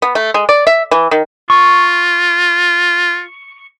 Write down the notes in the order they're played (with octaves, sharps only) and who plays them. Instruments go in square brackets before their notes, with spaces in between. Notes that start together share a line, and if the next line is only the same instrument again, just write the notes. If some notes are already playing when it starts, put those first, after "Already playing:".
[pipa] B3
A3
G#3
D5
E5
E3
D#3
[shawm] F4 [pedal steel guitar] C#6